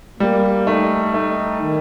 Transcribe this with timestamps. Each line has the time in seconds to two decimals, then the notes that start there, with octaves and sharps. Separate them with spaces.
0.20 G3 A#3
0.67 A3 D#4
1.14 A3 D#4
1.62 D#3